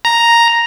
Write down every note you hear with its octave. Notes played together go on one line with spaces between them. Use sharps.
A#5